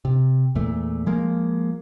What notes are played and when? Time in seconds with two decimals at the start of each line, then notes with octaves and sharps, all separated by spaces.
0.05 C3
0.55 E2 A#2 A3
1.06 F3 G#3 A#3